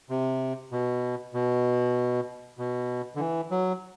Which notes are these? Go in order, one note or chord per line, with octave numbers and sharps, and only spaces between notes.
C3
B2
B2
B2
D3
E3
F#3